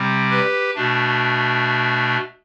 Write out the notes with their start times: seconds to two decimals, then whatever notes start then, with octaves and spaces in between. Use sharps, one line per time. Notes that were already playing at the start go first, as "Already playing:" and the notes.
Already playing: C3 G3 C4
0.31 G4 B4
0.75 B2 A3 D4